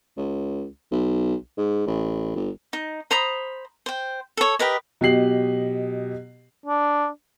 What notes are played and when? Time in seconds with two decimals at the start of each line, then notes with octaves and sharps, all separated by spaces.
0.17 C#2
0.92 B1
1.57 G#2
1.87 A1
2.36 G1
2.73 D#4
3.11 C5 A#5 B5 D#6
3.86 C5 G5
4.37 A4 C#5
4.59 G4 A#4 B4 D#5
5.01 B2 F#3 G4 D#5 C7 F#7
6.66 D4